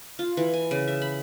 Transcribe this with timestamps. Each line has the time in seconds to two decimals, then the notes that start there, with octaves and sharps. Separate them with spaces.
0.19 F4
0.37 E3
0.54 G#5
0.71 C#3
0.88 E5
1.02 B5